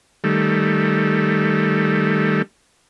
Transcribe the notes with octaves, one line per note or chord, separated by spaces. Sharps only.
D#3 G3 A3